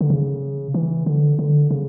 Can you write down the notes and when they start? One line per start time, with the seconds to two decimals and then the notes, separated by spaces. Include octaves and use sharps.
0.01 D3
0.10 C#3
0.74 E3
1.06 D3
1.39 D3
1.71 C#3